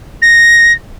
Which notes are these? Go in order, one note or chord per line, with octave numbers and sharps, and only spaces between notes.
A#6